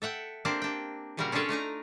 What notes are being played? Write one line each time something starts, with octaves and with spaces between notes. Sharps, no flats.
A4 E5 F#5 G5
A#3 C4 D4 G4
D4 G5
A#2 C#3 G3 A#3 F#4 A#4
C#4 D4 F4 G#4 A4 C#5
A3 D4 D#4 A#5